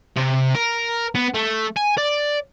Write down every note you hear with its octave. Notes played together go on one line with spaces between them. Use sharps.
C3
A#4
B3
A3
G#5
D5